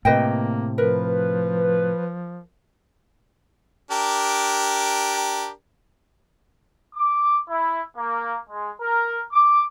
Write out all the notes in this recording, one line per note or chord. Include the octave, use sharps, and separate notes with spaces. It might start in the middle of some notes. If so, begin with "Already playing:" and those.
A2 C3 A#3 B4 D#5 G5
F3 A#4 B4
D4 G4 A#4
D6
E4
A#3
G#3
A#4
D6